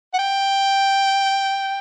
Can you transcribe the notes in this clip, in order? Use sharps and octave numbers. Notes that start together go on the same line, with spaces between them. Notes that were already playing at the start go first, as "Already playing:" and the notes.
F#5
G5